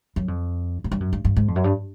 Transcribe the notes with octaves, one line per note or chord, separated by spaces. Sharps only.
F#2
F2
G#2
G2
F#2
G2
G2
G#2
F2
F#2
G2